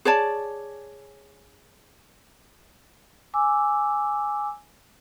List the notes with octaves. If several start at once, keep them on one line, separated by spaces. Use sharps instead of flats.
G#4 C#5 D5 A5
G#5 D6 E6